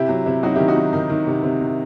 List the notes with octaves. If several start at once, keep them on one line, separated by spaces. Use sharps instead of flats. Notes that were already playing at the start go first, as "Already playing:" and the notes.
Already playing: C3 E4 G4
F#3
C3 E4
F#3 D#4 F#4
D#3 E4 G4
D#4 F#4
F#3
D#3 D#4
D#3
C3
C3
D#3